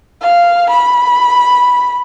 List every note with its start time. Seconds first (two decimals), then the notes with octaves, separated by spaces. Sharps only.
0.22 F5
0.70 B5